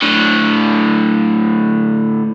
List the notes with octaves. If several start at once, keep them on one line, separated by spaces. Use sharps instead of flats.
A2 D3